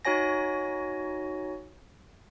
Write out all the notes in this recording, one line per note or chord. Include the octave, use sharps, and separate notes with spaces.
D#4 F#4 C#5 G#5 A#6